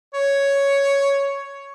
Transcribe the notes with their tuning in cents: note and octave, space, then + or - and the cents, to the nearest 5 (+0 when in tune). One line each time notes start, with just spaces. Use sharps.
C#5 +5